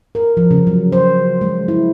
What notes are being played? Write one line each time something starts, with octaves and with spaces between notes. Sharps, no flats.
A#4
F3
C#3
F#3
C5
G#3
E4